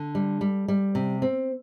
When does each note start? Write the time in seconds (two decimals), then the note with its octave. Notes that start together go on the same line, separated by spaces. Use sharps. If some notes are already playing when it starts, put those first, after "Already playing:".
Already playing: D3
0.15 G3
0.41 G3
0.68 G3
0.95 C3
1.22 C4